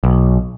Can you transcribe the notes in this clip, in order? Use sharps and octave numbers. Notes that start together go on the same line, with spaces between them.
B1